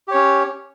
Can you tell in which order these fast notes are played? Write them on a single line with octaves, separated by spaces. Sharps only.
G4 C#5 C#4